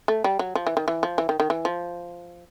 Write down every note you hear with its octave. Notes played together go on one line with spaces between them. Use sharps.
A3
G3
F#3
F3
E3
D#3
E3
F3
E3
D#3
D#3
E3
F3